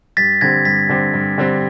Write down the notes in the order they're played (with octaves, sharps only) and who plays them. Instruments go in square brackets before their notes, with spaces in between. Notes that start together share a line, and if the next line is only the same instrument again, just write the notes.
[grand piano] G2 [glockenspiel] A6 B6
[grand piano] D3 G3 C4 [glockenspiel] G#6 A#6
[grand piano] G2 [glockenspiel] A6 B6
[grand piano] D3 G3 C4
G2
D3 G3 C4